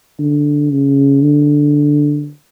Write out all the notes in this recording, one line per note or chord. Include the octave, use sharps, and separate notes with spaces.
D3
C#3
D3